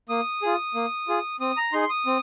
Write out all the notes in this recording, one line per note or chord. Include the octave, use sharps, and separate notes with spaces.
A#3 D#6
F4 G#4
A#3
F4 G#4
C4 D#6
A#5
D#4 G#4 C6
D#6
C4